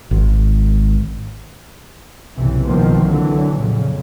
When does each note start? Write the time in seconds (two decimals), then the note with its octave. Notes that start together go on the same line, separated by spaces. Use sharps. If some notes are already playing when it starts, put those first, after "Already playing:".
0.11 G#1
2.37 F#1 B1 C3 E3
2.66 C2 B2 D#3 F3 A#3 C4
3.02 D3 E3 F#3
3.56 F2 A#2 C#3